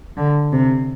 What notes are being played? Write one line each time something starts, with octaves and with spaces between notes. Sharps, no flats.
D3
C3